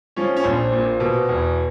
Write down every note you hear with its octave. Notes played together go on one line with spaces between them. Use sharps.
F3 C#4
C#4
A#1 C4
A#2
B2
E2